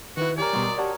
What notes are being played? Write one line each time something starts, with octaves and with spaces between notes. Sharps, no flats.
D#3 E4 F#4 B4
G4 A#4 C#5 D5 G#5
B2 F#3 G3 D#5 C6
G4 C#5 D5 F#5 A5